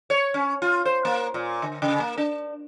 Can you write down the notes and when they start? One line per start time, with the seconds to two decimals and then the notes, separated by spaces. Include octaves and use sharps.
0.10 C#5
0.34 C#4
0.62 F4
0.85 C5
1.05 A#3
1.34 A#2
1.62 D3
1.82 C#3
2.00 A#3
2.18 D4